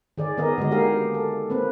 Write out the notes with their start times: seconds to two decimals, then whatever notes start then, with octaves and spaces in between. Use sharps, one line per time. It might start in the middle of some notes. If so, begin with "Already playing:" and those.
0.18 D#3 G#4 D5
0.37 D#3 B3 G#4 A#4 D#5
0.58 D3 D#3 G#3 F#4 D#5
0.71 A#3 D#4 G4 G#4 A#4 F5
1.14 A4
1.50 A#3 C4 B4